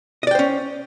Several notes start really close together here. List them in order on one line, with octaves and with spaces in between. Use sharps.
D#5 D5 G5 C5 C#4